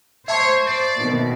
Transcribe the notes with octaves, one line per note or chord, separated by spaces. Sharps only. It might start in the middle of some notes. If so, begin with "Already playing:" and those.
C5 C#5 E5 A5 C#6
D5
B2 D#3 C4